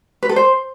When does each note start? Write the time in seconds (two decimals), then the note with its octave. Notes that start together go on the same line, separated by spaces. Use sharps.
0.23 B4
0.29 A4
0.36 C5